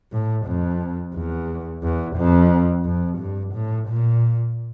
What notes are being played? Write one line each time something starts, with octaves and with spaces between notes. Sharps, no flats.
A2
F2
E2
E2
F2
F2
G2
A2
A#2